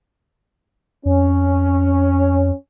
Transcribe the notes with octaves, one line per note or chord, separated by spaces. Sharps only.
F2 C#4